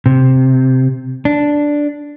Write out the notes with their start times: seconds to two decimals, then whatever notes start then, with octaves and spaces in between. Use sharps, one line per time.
0.06 C3
1.25 D4